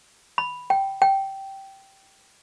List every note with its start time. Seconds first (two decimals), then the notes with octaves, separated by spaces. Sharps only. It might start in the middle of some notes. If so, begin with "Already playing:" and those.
0.38 B5
0.70 G5
1.02 G5